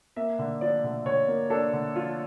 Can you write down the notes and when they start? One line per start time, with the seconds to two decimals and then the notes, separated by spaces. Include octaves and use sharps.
0.16 A#3 E5
0.39 D3
0.61 F3 D5
0.84 D3
1.05 D3 C#5
1.28 A#3
1.50 D4 A4
1.73 D3
1.96 F3 F4